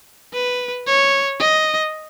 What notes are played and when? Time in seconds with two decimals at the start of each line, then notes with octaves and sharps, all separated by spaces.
0.33 B4
0.87 C#5
1.40 D#5